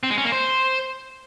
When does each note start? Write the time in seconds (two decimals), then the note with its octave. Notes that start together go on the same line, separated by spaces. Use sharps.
0.03 C4
0.11 G#3
0.18 C#4
0.25 A#3
0.32 C5